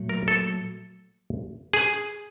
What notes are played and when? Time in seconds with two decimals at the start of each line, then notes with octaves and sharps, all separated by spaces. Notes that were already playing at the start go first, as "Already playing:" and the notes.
Already playing: A#2 F#3 A3
0.09 A#4
0.28 A4
1.73 G#4